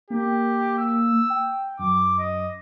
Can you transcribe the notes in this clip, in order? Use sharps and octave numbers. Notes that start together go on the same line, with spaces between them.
A#3 G4
E6
G5
F#2 D6
D#5